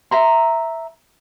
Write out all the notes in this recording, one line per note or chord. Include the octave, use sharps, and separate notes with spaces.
E5 A#5 C6